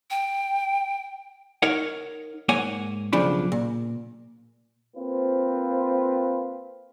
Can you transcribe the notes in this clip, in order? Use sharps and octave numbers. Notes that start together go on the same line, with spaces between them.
G5
D#4 A#4 C#5 F#5
G#2 A#3 C#5 F#5 G#5
B1 C#3 F3 D4 B5
A#2
A#3 C4 F4 B4 C5